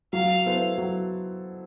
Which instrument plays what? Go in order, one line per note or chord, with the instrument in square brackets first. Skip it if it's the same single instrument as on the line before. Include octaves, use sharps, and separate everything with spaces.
[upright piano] F#3 [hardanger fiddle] F5
[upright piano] B3 E4 A4 C5
F#3